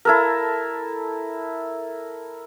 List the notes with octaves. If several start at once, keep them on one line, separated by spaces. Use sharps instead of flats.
E4 A4 A#4